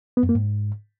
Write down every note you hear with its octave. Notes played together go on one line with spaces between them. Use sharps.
B3
F#2
A#3
G#2